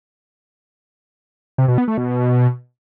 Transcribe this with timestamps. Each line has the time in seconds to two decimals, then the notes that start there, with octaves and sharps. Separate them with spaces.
1.58 C3
1.68 B2
1.78 B3
1.88 A3
1.98 B2